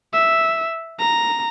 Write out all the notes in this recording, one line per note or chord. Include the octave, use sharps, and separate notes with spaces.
E5
A#5